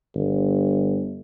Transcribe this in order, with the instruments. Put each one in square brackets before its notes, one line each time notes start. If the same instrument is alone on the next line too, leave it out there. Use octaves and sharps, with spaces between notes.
[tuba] G1